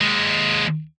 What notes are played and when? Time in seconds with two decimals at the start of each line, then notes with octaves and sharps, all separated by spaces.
0.01 D#2 G#3